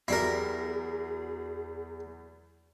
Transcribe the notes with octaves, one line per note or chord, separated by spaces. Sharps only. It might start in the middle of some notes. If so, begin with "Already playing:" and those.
E2 F#3 E4 G4 G#4 A#4 D5 C7